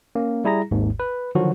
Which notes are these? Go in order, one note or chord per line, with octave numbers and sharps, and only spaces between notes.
A#3 C#4
G3 E4 G#4 A#5 A#6
G#1 D#2 G#2
B4
D3 D#3 F3 F#3 F#4